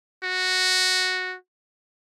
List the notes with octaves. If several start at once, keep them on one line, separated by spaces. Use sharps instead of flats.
F#4